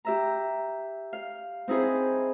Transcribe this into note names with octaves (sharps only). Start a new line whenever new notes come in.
G4 E5 A#5
F5
C4 D#4 E4 G#4 C5